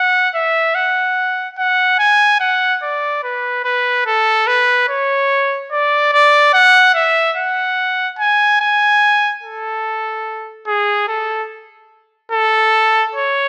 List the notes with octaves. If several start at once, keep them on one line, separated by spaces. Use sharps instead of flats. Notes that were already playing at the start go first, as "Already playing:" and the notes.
Already playing: F#5
E5
F#5
F#5
G#5
F#5
D5
B4
B4
A4
B4
C#5
D5
D5
F#5
E5
F#5
G#5
G#5
A4
G#4
A4
A4
C#5